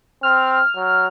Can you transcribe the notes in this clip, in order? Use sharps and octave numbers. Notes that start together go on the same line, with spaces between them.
C4 F6
F#3